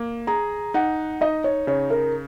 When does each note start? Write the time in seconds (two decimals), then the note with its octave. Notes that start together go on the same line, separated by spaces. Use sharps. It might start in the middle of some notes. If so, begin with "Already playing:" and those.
Already playing: A#3
0.27 G#4 A#5
0.74 D#4 F#5
1.21 D#4 D#5
1.44 C#5
1.67 C#3 C#5
1.90 A#4